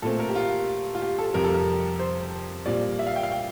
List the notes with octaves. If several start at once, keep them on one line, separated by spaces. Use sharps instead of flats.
A#2 A3 C4 A4
A#4
G4
F4
F4
G4
A4
F2 C3 G3 A#4
A4
A#4
C5
A#2 G3 C4 D5
E5
F5
G5
F5
G5